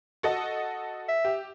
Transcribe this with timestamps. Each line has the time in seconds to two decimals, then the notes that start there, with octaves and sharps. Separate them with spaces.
0.23 F#4 A4 D#5
1.08 E5
1.25 G4